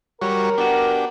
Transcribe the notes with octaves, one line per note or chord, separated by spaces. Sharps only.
G3 F#4 A#4 C#5
B3 D4 F#4 G4